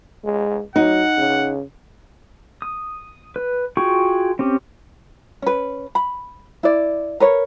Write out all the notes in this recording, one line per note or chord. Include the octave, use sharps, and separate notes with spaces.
G#3
F#3 D#4 F#5
C#3
D#6
B4
F4 F#4 G#4 G5 C#6
C4 C#4 G4
C#4 B4
B5
E4 D5
A#4 B4 C#5